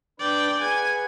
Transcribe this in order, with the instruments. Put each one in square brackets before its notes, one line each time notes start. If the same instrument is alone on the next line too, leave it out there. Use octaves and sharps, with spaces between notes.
[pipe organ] D4 B4 [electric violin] D5 G5
[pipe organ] G#4 B4 F#5 [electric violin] G#5